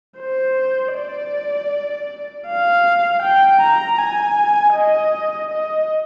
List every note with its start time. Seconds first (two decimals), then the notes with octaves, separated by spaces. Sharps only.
0.19 C5
0.95 D5
2.48 F5
3.23 G5
3.62 A#5
3.99 G#5
4.75 D#5
5.51 D#5